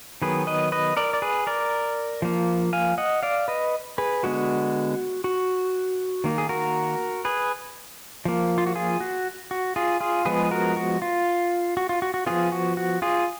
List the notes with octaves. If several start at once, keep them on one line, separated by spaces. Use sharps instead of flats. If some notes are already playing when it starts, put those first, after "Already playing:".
D#3 F#3 B3 G#4 B4
B4 D#5
B4 D#5
A#4 D5
D5
G#4 B4
A#4 D5
F3 A#3
F5 G#5
D#5 F#5
D5 F5
B4 D#5
G#4 B4
D3 G#3 B3 F#4
F#4
D#3 A#3
G#4
F#4 A#4
G#4 B4
F3 A#3
F4
F#4
F4 G#4
F#4
F#4
F4 G#4
F4 G#4
F3 G#3 B3 G#4 B4
F#4 A#4
F#4
F4
F#4
F4
F#4
F#4
F3 B3 F4 G#4
F#4
F#4
F4 G#4